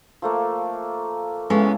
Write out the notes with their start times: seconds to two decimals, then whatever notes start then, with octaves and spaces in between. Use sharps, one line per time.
0.22 F3 A3 A#3
1.50 C#3 E3 G#3 A3 B3 C#4